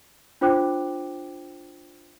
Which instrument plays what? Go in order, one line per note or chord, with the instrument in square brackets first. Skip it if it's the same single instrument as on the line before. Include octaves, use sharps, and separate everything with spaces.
[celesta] D4 F4 C5 G5 D6 F#6